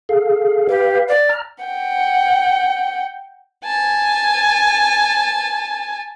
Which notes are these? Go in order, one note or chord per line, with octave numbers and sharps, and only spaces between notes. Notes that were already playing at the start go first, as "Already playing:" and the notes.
G#4 A4 F5
G4 B4 F5
D5
A#5 F6
F#5 G5
G#5 A5